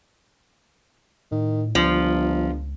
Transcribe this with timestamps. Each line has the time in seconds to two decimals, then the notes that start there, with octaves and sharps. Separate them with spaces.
1.32 A2 D#3
1.75 G1 C#2 F3